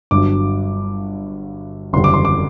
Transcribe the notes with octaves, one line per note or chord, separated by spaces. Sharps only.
G1 G2 F#3 D6
F#1 E2 D3 G3 C6
D6
C6
D6